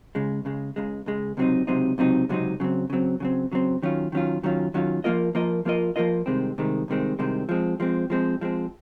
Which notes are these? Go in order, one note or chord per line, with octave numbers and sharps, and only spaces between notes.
C#2 C#3 G#3
C#2 C#3 G#3
C#2 C#3 G#3
C#2 C#3 G#3
C#2 C3 F#3 C4 D#4
C#2 C3 F#3 C4 D#4
C#2 C3 F#3 C4 D#4
C#2 C3 F#3 C4 D#4
C#3 F#3 C4
C#3 F#3 C4
C#3 F#3 C4
C#3 F#3 C4
D#3 F#3 C#4 F4
D#3 F#3 C#4 F4
D#3 F#3 C#4 F4
D#3 F#3 C#4 F4
F3 A#3 F4 A#4 D#5
F3 A#3 F4 A#4 D#5
F3 A#3 F4 A#4 D#5
F3 A#3 F4 A#4 D#5
C2 C3 D#3 G#3 C4
C2 C3 D#3 G#3 C4
C2 C3 D#3 G#3 C4
C2 C3 D#3 G#3 C4
F3 G#3 C4
F3 G#3 C4
F3 G#3 C4
F3 G#3 C4